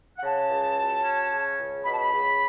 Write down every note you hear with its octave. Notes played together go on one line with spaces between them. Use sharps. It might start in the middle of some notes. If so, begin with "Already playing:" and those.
F#5
C#3 A5
C#2
F#3
C#4
C#3
C#2
B2 B5
A5
B5
C#2